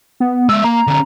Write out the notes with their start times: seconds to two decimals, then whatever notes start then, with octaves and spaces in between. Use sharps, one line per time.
0.20 B3
0.49 G#3 E5 E6
0.64 A#3 A#5
0.87 D3 C#4